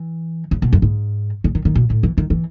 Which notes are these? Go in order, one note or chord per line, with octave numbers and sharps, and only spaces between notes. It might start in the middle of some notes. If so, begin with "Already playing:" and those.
Already playing: E3
C#3
B2
F#2
G#2
C#3
D#3
D#3
B2
A2
E3
D#3
E3